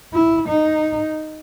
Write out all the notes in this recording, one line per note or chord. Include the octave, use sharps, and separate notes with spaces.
E4
D#4